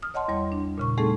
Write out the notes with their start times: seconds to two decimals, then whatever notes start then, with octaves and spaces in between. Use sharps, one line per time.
0.02 D#6 F6
0.14 C#5 D#5 F#5 A5 C6
0.28 E2 G3 C#5 C6
0.52 D4
0.78 A#2 C#3 C#6
0.98 G3 A3 C4 D#4 G#4 A4